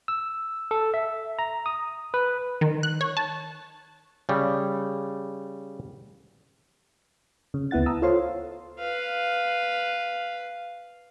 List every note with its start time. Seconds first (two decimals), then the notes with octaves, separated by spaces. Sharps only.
0.08 E6
0.71 A4
0.94 E5
1.39 A#5
1.66 D#6
2.14 B4
2.61 D#3
2.83 F#6
3.01 C#5
3.17 A5
4.29 C#3 G3
7.54 C#3
7.71 D2 B3 E4 F#5 A6
7.86 A5 A#5 D#6 E6
8.02 F4 A4 C5 C#5 F5 C6
8.79 B4 F5